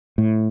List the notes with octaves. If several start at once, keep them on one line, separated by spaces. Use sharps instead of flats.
A2